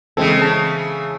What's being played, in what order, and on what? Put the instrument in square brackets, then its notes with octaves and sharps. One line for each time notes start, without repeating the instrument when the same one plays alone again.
[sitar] C#3 E3 [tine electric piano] G#3 C4 A4
[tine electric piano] A5